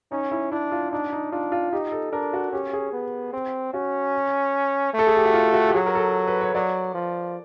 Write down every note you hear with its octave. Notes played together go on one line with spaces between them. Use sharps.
C#4 D#4
E4
D4 E4
F4
D4 D#4
D#4
D4 F4
F4
D#4 G4
A4
D4 A#4
F#4
C#4 G4
G#4
B3
C4
C#4 F#4
A3 A4
G#4
G4
F#4
F4
F#4
G4
F#3 G#4
A#4
A4
B4
C#5
F#3 D5
F3